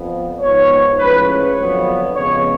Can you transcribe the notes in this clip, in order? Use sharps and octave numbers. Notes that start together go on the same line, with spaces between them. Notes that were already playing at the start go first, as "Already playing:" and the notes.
Already playing: F2 F3 B3
G#2 F3 B3 C#5
A2 F3 G#3 C#4 B4
C#5
F2 D3 F#3 B3
F2 C#3 G#3 B3 C#5